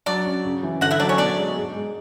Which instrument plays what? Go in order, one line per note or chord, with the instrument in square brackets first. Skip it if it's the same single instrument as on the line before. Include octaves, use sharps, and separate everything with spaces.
[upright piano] F#3 [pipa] D4 D5
[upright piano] C#4
C#3
E3
[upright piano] D3 [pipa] F#4 F#5
[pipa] E4 E5
[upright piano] F#3 [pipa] D4 D5
[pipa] C#4 C#5
[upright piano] B2 [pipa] D4 D5
[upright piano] G#3
G#2
G#3